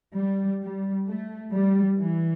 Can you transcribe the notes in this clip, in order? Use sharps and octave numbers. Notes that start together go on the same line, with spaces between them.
G3
G3
A3
G3
E3